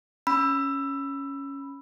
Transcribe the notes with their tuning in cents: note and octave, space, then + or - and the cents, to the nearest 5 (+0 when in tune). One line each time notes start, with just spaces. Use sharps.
C#4 +0 B5 +0 E6 +15